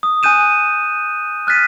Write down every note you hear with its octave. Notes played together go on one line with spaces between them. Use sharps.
D#6
G#5 F#6 G6 D#7 E7
F6 F#6 A6 B6 D#7